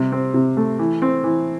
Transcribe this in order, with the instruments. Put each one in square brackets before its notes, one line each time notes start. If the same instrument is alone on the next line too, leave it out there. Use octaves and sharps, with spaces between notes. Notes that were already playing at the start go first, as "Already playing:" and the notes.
Already playing: [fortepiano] C3 G3
C4
C3
A3
E3
C4
E3